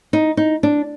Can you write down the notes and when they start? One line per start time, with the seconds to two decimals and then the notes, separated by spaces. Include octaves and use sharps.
0.13 D#4
0.37 D#4
0.63 D4